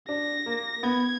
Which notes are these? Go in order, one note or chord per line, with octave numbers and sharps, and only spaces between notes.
D4 A#6
A#3
B3 G#6